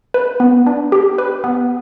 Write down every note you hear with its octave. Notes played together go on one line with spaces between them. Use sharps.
B4
B3
D4
G4
B4
B3